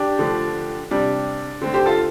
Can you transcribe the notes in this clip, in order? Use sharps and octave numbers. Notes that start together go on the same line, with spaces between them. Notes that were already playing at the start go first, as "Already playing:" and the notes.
Already playing: D4 G4
D3 F3 A3
C3 G3 D4
D3 A3 C4
G4 C5
F4 A4